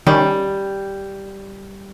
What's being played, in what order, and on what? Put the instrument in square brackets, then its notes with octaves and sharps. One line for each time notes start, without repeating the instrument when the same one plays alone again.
[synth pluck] D#3 C#4 [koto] G3